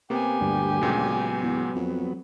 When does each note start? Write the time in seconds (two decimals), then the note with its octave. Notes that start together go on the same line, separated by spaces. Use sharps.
0.10 C3 A#3 B3 G4 G#5
0.41 D2 G2 D3 G3
0.81 A#2 C#3 F#3 G#3 B3
1.42 E2
1.75 F2